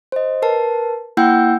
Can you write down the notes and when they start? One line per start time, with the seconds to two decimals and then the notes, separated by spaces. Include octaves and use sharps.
0.12 C5 D#5
0.42 A#4 B4 A5
1.17 A#3 E4 F#5 G5 E6 G6